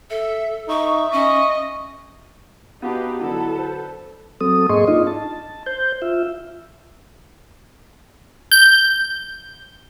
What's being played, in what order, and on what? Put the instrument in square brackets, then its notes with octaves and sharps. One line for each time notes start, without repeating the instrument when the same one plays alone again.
[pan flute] A4 [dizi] E5
[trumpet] D#4 [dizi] E5 [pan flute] C#6
[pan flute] C#4 [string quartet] D#5 [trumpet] C#6
[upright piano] B3 F#4 A5 [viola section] D#4 G4 B4 [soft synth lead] F5
[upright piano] D3 F#3 [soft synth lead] E4 [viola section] A4 B4
[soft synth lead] C5
[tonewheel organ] F#3 C4 A4 D#6
G#2 A#3 G#4 D#5 C6 C#6
D4 D#4 F4 D#5
A5
C5 G6
F4 E5
[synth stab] G6